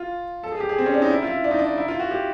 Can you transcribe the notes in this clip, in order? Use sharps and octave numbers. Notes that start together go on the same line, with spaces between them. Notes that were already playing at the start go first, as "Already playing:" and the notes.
Already playing: F4
A4
G#4
G4
G#4
C4
C#4
D4
D#4
E4
F4
E4
D4
D#4
D4
E4
F4
F#4
G4